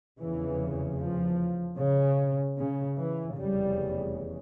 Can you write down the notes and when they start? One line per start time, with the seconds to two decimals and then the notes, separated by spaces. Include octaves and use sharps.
0.19 F1 E2 C#3 E3
0.99 F3
1.79 C#3
2.58 C#3
2.98 E3
3.38 F1 E2 C#3 G3